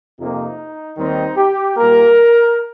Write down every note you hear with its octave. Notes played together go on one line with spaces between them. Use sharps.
F2 C3 F3 A#3 D#4
D#2 D#3 G3 C4 D#4
G4
A#2 G3 A#3 A#4